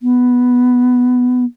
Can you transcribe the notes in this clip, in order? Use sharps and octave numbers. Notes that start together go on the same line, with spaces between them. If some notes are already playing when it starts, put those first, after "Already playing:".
B3